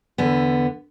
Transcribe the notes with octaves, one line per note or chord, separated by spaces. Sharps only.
E2 D3 B3